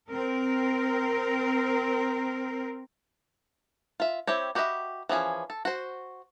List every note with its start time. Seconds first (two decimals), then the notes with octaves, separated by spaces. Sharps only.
0.11 C4 A#4
4.00 F4 E5
4.27 C4 E4 G4 C#5
4.55 F#4 G4 B4 D#5 E5
5.09 E3 F3 C#4 G#4
5.50 A4
5.65 F#4 C5